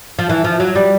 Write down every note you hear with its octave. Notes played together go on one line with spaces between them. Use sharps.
F3
E3
F3
F#3
G3